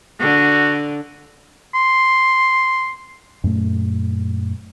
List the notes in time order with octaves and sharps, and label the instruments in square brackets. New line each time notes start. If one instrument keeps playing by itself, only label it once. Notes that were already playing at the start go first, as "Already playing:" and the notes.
[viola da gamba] D3 [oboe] F#4
[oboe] C6
[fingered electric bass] F#2 A#2 A3